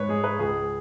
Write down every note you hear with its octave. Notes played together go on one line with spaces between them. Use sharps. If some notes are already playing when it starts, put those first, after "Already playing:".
Already playing: G#2 B4 C#5
G#3 G#4
B4
C#2 G#4